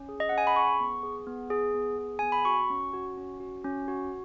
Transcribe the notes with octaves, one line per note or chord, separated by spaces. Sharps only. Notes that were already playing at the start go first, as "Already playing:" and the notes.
Already playing: C#4
G#4
D#5
C#4 F#5
G#5
B5
G#4 C#6
B3
G#4
B3
G#4
B3
G#4
B3 G#5
B5
F#4 C#6
C#4
F#4
C#4
F#4
C#4
F#4